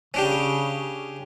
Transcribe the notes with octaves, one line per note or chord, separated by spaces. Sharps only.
C#3 C#4 D4 G4